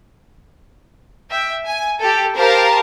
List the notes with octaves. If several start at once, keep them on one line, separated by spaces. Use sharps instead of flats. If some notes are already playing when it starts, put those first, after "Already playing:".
E5 G5
G#5
G4 A4
G4 A#4 C5 F5 A5